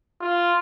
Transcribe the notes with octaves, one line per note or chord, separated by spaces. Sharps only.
F4